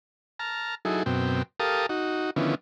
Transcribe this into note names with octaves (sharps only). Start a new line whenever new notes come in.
A5 A#5 F6
F#3 D#4 E4 G#4 A4
F#2 B2 C4 G5
G4 A4 A#4 F5 A5 D#6
D#4 F#4
D3 D#3 F3 B3 C#4 E4